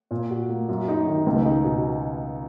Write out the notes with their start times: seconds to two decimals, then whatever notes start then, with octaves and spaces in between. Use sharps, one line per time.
0.11 A#2
0.30 F#4
0.50 A#3
0.69 F#2
0.88 D#4
1.07 D#3
1.26 C#2
1.45 D#4
1.65 B2